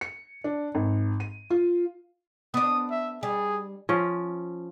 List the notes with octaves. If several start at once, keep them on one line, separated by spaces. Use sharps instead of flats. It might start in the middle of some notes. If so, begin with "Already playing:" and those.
C#7
D4
G#1
D#7
F4
B3 D4 D#6
E5
G3 G#4
F3 C#4